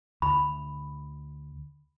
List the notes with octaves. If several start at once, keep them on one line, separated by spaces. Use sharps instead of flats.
D2 B5